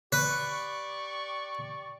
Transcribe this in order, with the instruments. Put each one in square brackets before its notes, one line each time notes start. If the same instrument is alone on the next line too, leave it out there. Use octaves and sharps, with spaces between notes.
[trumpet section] G4 D5 C#6 [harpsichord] B4